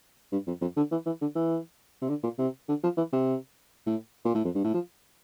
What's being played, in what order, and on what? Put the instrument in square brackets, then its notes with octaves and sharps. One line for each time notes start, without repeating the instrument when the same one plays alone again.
[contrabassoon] G2
F2
F2
D3
E3
E3
D3
E3
C3
D3
A#2
C3
D3
F3
E3
C3
A2
A#2
A2
F2
G2
A2
F3